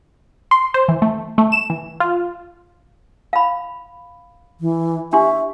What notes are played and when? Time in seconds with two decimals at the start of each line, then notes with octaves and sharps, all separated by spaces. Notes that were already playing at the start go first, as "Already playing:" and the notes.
0.51 C6
0.74 C5
0.88 E3
1.02 A3
1.38 A3
1.52 E7
1.70 E3
2.00 F4
3.33 F5 B5
4.61 E3
5.13 D4 G4 E5 C6